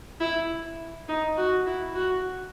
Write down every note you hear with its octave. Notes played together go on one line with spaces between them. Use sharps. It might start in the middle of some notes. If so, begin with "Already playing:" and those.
E4
D#4
F#4
E4
F#4